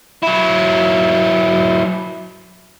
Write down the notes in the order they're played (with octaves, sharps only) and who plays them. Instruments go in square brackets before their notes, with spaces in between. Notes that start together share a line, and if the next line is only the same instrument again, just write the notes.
[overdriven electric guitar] F#3 E4